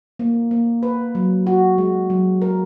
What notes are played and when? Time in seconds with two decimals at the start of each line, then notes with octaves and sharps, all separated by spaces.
0.19 A#3
0.51 A#3
0.83 B4
1.15 F#3
1.47 F#4
1.78 G#3
2.10 F#3
2.42 A#4